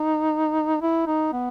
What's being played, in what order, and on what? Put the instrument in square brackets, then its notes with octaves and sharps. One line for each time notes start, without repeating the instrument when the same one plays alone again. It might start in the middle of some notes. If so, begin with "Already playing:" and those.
Already playing: [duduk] D#4
E4
D#4
B3